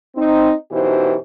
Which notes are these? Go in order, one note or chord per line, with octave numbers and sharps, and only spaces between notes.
C4 D#4
F#2 B2 E3 D#4 G4 C5